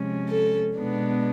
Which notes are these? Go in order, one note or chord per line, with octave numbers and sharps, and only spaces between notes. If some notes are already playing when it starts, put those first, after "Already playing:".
Already playing: C3 F3 G#3 C#4
A4
B2 G#3 B3 D4